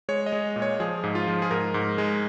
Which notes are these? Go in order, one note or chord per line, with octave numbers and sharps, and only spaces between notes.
G#3 C#5
D#5
G#3
A#2
C#5
F3 G#4
G#2
F4
F3
G#4
G#2 A#4
G#2
G#3